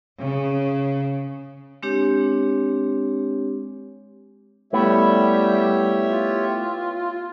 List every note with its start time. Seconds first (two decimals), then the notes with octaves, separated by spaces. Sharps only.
0.21 C#3
1.83 G#3 C4 D4 G4 C#5
4.73 G3 A3 B3 E4 G4 C#5 E5
6.09 F4